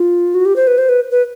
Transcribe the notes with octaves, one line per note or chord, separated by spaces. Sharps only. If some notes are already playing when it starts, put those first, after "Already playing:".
Already playing: F4
F#4
G4
C5
B4
C5
B4
B4